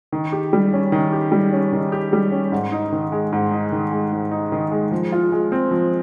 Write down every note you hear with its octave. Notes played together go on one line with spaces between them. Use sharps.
D#3
G4
G3
C#4
D#3
G4
G3
C#4
D#3
G4
G3
C#4
G#2
D#4
D#3
G#3
G#2
D#4
D#3
G#3
G#2
D#4
D#3
G#3
F3
F4
G#3
C4
F3